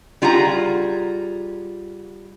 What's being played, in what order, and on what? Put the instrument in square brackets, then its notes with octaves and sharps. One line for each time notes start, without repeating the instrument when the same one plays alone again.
[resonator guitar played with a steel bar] G3 F4 G#4 F#5 A#5